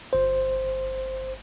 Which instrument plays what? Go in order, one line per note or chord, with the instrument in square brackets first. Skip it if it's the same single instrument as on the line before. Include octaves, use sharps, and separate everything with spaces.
[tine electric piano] G1 C5